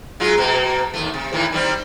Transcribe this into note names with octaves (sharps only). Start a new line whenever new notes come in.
F#3 G#3 F4
B2 A#3
D#2 A2 A3
C3
A2 D#3 E3
D#3 G3 C4